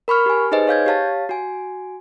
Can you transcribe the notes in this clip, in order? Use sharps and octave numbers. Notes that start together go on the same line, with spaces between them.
A#4 B5 C#6 F6
G4 G#5
D#4 G#4 B4 C5 D#5 G#5
C#5 F5 G6 G#6
G4 C#5 F5 A5 A6
F#4 G#5